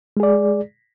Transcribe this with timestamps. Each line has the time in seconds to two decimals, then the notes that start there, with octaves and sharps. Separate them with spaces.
0.17 G#3
0.20 G#4
0.23 D5